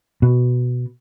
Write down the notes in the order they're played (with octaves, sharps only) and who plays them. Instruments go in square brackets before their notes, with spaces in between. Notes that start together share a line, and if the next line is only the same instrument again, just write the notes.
[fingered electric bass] B2